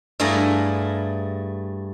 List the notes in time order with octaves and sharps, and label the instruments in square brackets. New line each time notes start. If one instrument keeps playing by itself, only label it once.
[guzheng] G2 A3 E4 G#4 F5 A#5